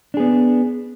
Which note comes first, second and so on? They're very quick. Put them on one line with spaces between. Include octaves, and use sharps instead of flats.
D4 G#4 B3